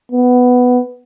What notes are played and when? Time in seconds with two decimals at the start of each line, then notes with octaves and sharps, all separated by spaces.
0.12 B3